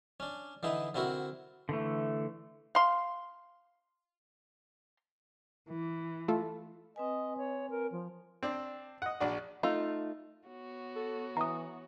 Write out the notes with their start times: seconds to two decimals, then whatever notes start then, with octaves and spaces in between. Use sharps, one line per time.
0.20 C#4 D4
0.63 D3 E3 D#4 E4
0.94 D3 C4 E4 F#4 A#4
1.69 D3 E3 A3
2.75 F5 C6
5.70 E3
6.28 A3 F4 A4
6.96 C4 B4 D#5 G#5
7.37 C#5
7.70 A#4
7.92 F3
8.43 C4 D4
9.02 D#5 F#5
9.20 A#1 D4 F#4
9.63 A3 D#4 F4
10.46 B3 F#4 C#5
10.96 A4
11.37 E3 A#5 D#6